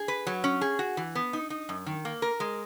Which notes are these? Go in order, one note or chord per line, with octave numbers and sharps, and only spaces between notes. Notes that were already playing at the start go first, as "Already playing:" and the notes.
Already playing: G#4
B4
F#3
C#4
G#4
F#4
E3
B3
D#4
D#4
F#2
D#3
A#3
A#4
G#3